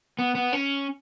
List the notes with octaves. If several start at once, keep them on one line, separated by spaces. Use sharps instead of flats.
B3
B3
C#4